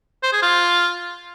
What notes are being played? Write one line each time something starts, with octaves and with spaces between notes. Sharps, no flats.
C5
G#4
F4